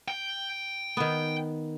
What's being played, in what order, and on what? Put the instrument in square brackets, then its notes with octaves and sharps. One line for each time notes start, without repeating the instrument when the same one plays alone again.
[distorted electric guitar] G5
[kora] D#3 B3